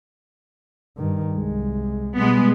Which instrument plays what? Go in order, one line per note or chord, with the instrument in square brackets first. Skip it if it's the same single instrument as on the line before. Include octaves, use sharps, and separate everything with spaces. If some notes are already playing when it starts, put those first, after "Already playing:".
[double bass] G2 D#3
C2 G#3
[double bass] B2 G3 [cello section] G#3 B3